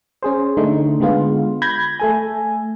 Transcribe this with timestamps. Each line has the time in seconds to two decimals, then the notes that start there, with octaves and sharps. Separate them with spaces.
0.23 C#4 G#4 C5
0.57 D3 A3 D#4
1.00 D3 G#3 B3 F4
1.62 B5 G6 G#6 A#6
2.00 A3 A4 G#5